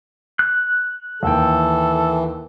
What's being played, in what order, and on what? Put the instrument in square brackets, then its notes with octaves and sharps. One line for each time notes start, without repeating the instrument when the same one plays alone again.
[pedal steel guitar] F#6
[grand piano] D#2 G5 [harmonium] E3 [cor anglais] A4